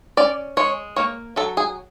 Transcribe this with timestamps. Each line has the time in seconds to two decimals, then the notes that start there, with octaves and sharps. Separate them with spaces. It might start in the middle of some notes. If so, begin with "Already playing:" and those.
0.17 C#4 D5
0.57 G#3 C#5
0.96 A#3 C#5
1.36 F#3 A4
1.57 G#4